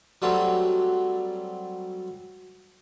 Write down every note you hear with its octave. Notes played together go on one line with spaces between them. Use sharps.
F#3 G3 A3 C4